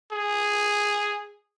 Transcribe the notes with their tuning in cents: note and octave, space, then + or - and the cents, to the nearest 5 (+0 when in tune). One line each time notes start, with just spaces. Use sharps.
G#4 -5